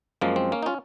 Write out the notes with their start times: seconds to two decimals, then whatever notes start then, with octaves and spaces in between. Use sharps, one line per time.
0.21 F#2 F3 G#3 A#3
0.36 C4
0.52 A#3 C#4
0.63 D#4
0.66 C#4 F4